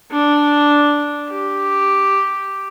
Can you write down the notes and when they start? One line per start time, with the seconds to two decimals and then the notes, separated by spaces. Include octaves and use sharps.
0.11 D4
1.30 G4